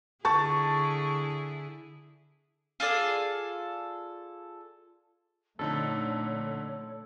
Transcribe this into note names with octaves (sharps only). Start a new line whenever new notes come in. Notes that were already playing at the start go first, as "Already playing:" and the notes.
D3 E4 G#4 A5 C#6 A6
F4 G#4 A4 D5
F2 A#2 D3 A3 D#4 A4 C#5